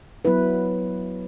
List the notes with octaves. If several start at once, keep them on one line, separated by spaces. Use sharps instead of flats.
F#3 B3 E4 B4